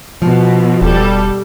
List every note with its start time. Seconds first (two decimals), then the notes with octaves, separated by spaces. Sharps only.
0.22 B2 F3
0.82 E1 G3 A4